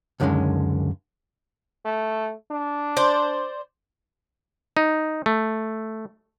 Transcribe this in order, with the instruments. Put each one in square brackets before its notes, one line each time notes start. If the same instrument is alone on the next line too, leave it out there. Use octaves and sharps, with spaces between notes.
[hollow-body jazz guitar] C#2 F#2 D3 D#3 G#3 C#4
[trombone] A3
D4
[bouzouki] C5 D5
[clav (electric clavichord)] D#4
A3